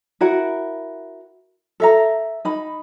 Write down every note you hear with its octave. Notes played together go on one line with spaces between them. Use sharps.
E4 F#4 A#4 F#5
A4 E5 A#5
D#4 B5